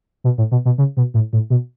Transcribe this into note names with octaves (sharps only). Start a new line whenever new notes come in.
B2
A2
B2
B2
C#3
B2
A2
A2
B2